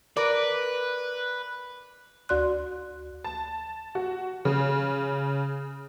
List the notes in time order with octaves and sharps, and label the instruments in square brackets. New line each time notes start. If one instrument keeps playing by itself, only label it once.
[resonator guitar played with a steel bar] A#4 D5 [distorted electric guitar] B4
[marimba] D2 F#4 D5 C6 F#6
[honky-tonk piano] A5
F#4
C#3